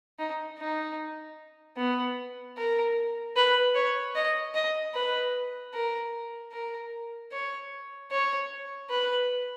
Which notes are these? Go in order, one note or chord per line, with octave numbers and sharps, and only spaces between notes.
D#4
D#4
B3
A#4
B4
C#5
D#5
D#5
B4
A#4
A#4
C#5
C#5
B4